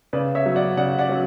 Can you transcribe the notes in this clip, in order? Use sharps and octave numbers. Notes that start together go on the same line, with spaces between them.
C#3 B4 D5
C#5 E5
F#3 C#4
D5 F#5
C#3 D5 F#5
D5 F#5
F#3 C#4